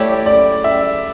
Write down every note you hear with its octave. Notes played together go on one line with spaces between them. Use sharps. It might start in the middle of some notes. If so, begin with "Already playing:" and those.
Already playing: A3 E4 G4 C#5 D5
D5
E5